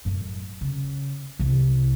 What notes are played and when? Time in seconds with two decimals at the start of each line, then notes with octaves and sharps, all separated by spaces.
0.05 F#2 A2
0.61 C#3
1.39 C2 C3